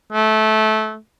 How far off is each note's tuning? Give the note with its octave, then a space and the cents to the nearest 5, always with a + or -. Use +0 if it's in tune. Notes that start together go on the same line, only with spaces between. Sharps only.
A3 -20